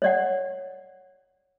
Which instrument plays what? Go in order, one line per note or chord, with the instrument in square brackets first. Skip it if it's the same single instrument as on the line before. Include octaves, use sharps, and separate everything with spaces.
[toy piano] C#5 D5 F#5